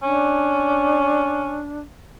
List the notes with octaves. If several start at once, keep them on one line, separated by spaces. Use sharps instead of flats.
C#4 D4